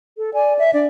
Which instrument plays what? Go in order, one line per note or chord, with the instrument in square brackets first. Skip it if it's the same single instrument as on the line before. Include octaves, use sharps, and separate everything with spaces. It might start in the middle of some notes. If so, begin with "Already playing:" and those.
[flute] A4
[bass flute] D5 [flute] G#5
[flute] E5
[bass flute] D4 [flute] D5